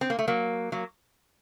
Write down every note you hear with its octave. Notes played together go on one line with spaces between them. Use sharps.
C4
A#3
A3
F#3 A#3
F#3 A#3